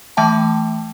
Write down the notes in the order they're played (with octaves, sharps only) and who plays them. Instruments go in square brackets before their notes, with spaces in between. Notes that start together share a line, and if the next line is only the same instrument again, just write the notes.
[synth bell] E3 A3 E5 G5 A5